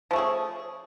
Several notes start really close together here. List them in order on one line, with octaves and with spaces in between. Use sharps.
F3 A3 G#4 C#4